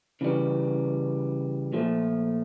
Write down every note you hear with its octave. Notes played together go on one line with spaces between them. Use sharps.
C#3 E3 G3
A#2 F3 A3